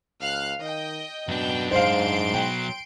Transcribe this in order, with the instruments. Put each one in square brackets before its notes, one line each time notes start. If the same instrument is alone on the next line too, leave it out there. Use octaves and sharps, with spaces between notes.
[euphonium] C#2 [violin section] F5 F6 F#6
[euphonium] D#3 [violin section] D#5 G5
[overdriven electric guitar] F#2 D4 [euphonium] B2 [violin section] G5
[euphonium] G#2 [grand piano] C5 F5 [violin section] C6 D7
[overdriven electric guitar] B2 F#3 [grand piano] G5